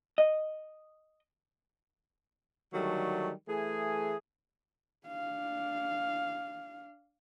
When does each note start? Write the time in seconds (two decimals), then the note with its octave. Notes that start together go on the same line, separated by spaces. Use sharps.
0.18 D#5
2.73 D3 D#3 F#3 G3 A3
3.48 E3 A3 G#4
5.07 D4 F5